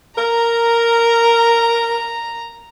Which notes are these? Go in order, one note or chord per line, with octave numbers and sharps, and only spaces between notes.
A#4 A#5